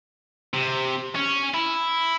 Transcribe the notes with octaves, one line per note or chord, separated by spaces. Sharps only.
C3
C#4
E4